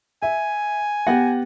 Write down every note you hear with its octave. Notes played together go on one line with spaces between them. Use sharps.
E5 G#5
B3 G4 F#5 A#6